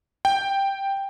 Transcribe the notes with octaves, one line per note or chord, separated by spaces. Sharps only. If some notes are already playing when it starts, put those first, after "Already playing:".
G5